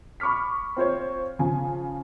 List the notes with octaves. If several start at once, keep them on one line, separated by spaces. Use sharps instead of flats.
B5 C#6 D6 F6 B6
C4 F4 C5 C#5
C#3 F3 G#5